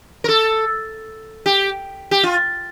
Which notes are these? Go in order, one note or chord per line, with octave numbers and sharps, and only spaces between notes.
A#4
A4
G4
G4
F4